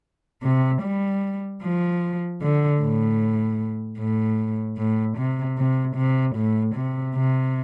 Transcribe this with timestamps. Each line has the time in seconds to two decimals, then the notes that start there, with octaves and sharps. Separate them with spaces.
0.42 C3
0.81 G3
1.61 F3
2.40 D3
2.80 A2
3.97 A2
4.76 A2
5.16 C3
5.56 C3
5.95 C3
6.34 A2
6.73 C3
7.14 C3